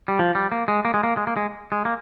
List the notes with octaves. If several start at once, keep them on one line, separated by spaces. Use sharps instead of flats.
G3
F3
G3
A#3
G#3
A#3
G#3
A#3
G#3
A#3
G#3
G#3
A#3